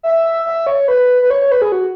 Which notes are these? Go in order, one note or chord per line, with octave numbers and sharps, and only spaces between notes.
E5
E5
C#5
B4
B4
C#5
C#5
B4
G#4
F#4